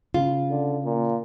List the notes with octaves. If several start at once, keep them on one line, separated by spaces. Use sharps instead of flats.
C#3 F4
D3
A#2